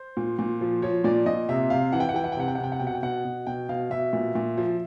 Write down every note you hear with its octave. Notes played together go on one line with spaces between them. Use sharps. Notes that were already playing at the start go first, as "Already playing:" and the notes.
Already playing: C5
A#2
A#2
F3
F3 C#5
A#2 D5
A#2 D#5
C3 E5
C3 F5
E3 F#5
G5
F#5
E3 G5
F#5
G5
C3 F#5
G5
F#5
C3
G5
F#5
B2 G5
F#5
G5
B2 F#5
B2
B2 G5
B2 F5
B2 E5
A#2
A#2
F3